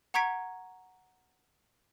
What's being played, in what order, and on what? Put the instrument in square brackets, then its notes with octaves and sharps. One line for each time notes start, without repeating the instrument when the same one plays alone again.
[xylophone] F#5 A#5 C#6 G#6 B6 D7